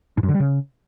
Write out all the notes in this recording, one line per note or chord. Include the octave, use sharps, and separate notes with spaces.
G#2
F#2
D3
G3
C#3